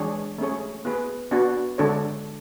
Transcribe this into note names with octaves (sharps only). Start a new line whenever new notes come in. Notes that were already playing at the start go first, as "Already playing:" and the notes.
Already playing: E3 G#3 D4 G#4 C#5
A3 C#4 G#4 C#5
B3 E4 G#4 B4
B3 D4 F#4
D3 G#3 D4 A4 C#5